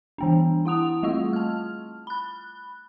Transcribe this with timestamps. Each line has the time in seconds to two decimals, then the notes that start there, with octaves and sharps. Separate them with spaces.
0.18 E3 B3 D4
0.65 E4 F#5 D#6 F7
1.03 G3 A3 F4 E6
1.33 A5 F6
2.07 B5 F#6